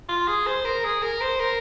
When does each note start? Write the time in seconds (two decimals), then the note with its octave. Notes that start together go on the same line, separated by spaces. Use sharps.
0.09 F4
0.28 G#4
0.46 C5
0.65 A#4
0.84 G#4
1.02 A#4
1.21 C5
1.40 A#4